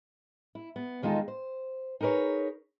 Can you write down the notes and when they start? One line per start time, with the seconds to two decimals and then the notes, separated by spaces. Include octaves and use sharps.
0.55 E4
0.76 B3
1.02 E2 D#3 G#3 F4 A4
1.28 C5
2.01 D#4 G#4 A#4 B4 C#5